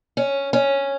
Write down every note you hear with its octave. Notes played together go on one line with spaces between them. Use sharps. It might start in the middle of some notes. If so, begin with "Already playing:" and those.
C#4
C#4